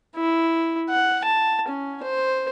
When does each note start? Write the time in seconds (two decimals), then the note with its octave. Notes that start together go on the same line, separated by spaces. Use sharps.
0.16 E4
0.90 F#5
1.25 A5
1.68 C#4
2.03 C5